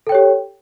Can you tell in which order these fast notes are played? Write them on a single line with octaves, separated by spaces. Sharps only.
A4 G5 C#5 G4